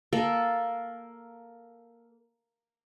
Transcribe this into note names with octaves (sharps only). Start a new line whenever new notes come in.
A#3 A4